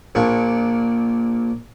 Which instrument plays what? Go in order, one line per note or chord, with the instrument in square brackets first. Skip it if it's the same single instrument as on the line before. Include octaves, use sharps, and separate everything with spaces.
[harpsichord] A#1 A#2 D4 C#6